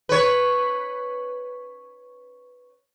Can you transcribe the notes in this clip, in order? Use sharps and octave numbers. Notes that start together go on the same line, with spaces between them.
B4 C#5